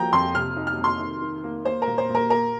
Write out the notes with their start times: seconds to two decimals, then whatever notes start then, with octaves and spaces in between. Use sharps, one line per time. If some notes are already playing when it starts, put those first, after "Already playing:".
Already playing: F3 A#3 G5 A#5
0.12 F2 C6
0.35 C3 F6
0.56 D#4
0.67 F6
0.78 C3
0.84 C6
0.99 D#3
1.22 D#3
1.44 A#3
1.65 A#3 C5
1.82 A#4
1.87 A#2
1.98 C5
2.09 A#2
2.15 A#4
2.30 A#3 A#4